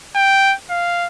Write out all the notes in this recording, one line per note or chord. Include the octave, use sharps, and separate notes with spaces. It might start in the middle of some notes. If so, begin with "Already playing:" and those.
G5
F5